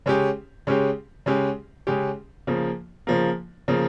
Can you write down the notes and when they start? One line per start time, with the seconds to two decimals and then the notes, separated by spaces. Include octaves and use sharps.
0.06 C#3 G#3 C#4 G4
0.67 C#3 G#3 C#4 G4
1.26 C#3 G#3 C#4 G4
1.87 C#3 G#3 C#4 G4
2.47 C#3 F3 A#3
3.07 C#3 F3 A#3
3.68 C#3 F3 A#3